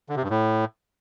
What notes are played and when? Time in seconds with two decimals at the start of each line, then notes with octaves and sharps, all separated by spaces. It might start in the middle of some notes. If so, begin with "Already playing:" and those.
0.09 D3
0.16 C3
0.23 G2
0.30 A2